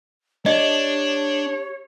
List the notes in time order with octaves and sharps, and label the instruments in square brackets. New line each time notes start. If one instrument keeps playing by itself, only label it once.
[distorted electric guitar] D4 [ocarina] G4 [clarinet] C#5 [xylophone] D#5